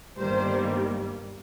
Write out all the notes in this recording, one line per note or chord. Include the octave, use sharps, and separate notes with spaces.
G1 G2 D#3 G3 A#3 C5